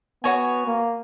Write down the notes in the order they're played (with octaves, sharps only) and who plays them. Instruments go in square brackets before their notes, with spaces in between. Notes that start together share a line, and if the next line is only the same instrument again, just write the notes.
[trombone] B3 [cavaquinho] F#4 C#5 G#5
[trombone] A#3